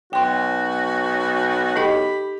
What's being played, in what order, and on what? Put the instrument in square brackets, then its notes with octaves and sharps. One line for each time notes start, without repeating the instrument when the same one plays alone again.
[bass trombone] B1 [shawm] F#4 [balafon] G5 C6
[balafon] D#4 A4 D#5 [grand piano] G4 [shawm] B5